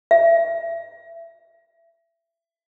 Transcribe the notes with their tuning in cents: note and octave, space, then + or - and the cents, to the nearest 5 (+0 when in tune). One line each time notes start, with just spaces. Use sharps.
E5 +25